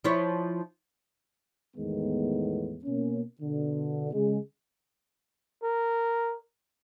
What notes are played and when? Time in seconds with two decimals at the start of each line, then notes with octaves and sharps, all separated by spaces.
0.04 F3 E4 C#5
1.77 E2 A2 D#3 G#3 B3
2.85 B2 A#3 C#4
3.42 B2 D3
4.13 C#3 G#3
5.63 A#4